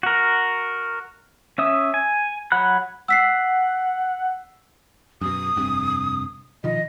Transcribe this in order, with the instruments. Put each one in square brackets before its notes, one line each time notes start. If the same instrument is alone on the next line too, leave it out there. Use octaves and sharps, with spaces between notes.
[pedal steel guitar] F#4 A#4
C#4 E5 D#6
G#5
F#3 F#5 B5 F#6
[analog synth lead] F#5 [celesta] E6 B6 C7
[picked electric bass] F#2 B2 [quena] D#6
[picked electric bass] F1 G2 C3
[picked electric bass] B2 D#3 F3 [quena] D#5